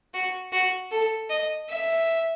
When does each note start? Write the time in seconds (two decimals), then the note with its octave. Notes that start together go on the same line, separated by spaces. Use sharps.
0.14 F#4
0.53 F#4
0.91 A4
1.30 D#5
1.70 E5